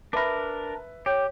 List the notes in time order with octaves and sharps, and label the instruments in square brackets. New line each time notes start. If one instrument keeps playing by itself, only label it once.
[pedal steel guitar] D4 A#4 [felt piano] B4 E5 B5
[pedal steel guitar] G4 [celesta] C#5 G5 G6